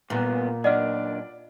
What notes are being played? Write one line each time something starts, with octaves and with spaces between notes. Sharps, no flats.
E2 G2 A#2 B3
F#2 D4 D5 D#5 F#5 F6